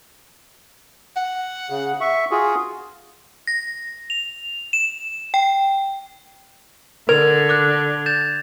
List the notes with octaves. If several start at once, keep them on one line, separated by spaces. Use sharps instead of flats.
F#5
C#3
E5 C#6
F4 F#4 G#4
A#6
F7
E7
G5
D3 A#4 G#6 F7
D6 F#6
G6 A6 E7